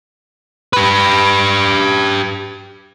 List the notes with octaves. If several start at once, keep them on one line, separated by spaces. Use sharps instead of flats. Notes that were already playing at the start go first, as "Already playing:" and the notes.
G4 B4